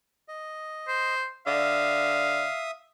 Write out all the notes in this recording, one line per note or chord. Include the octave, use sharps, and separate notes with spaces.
D#5
C5
D3 E5 F5 D#6